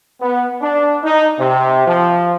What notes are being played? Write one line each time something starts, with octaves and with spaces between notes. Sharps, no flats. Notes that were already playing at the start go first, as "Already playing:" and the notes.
B3
D4
D#4
C3
F3